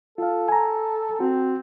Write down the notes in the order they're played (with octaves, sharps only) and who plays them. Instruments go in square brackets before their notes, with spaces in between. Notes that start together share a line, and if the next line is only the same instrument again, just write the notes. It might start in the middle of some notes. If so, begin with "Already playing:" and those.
[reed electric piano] F4 F5 [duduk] A4
[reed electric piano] G#5 A#5
[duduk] C4 [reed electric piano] F#4